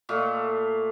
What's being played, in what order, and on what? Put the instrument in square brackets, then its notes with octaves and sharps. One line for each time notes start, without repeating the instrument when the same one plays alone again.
[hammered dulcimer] A#2 A3 F5